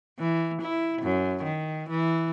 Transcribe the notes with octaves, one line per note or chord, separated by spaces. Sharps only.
E3
E4
F#2
D#3
E3